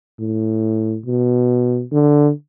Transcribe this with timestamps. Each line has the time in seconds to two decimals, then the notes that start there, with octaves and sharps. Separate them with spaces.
0.20 A2
1.06 B2
1.92 D3